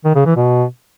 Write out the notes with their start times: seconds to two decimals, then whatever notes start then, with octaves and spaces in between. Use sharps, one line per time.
0.05 D#3
0.15 C#3
0.26 E3
0.36 B2